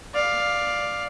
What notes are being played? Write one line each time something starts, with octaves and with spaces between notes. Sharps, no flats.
D5 F5